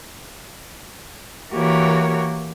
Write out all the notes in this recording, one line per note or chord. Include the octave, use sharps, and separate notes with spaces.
E3 A#3 F#4 G4 A#4 C#5